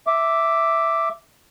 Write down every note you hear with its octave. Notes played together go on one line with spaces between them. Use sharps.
E5 D6